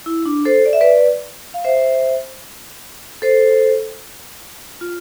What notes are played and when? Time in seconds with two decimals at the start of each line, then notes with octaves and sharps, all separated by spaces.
0.06 E4
0.26 D4
0.45 A4 C5
0.66 D5
0.73 E5
0.81 B4 D5
1.54 F5
1.64 C5 E5
3.22 A4 C5
4.81 F4